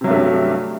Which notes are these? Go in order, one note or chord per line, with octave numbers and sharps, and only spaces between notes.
G2 C3 F#3 G3 A3